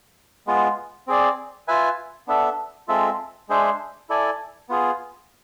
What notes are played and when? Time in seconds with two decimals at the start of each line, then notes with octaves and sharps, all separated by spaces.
0.47 G#3 B3 F4
1.07 C4 G#4 D5
1.68 F4 B4 E5 G#5
2.28 B3 D4 A4 E5
2.88 G#3 C4 F4 A4 E5
3.49 G#3 D4 G#4 C5 E5
4.09 E4 A4 D5 G#5
4.69 B3 F4 G#4